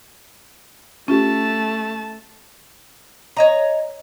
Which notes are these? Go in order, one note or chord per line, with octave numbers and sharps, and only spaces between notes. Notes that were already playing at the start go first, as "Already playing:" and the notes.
A3 C#4 F4 G4 A5
C#5 D#5 A#5